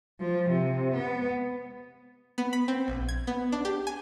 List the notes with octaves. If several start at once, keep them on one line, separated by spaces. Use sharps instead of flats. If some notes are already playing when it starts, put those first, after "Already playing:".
F3
C3
B3
B3
B5
C4
A#1
G#6
B3
D4
G4
G#5